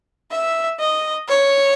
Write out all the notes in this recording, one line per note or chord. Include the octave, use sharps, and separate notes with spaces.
E5
D#5
C#5